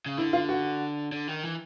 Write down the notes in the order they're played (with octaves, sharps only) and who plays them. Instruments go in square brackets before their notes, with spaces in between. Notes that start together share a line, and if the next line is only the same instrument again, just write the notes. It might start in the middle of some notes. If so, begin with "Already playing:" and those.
[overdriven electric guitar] C#3
[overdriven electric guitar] D3 [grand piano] E4
[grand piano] F4
F#4
[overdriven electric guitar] D3
D#3
E3